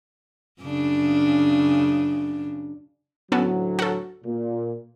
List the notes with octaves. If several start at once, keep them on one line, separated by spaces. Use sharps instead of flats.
F#2 C#3 D4
D2 A2 F#3 B3 C#4 A4
F#4 A4
A#2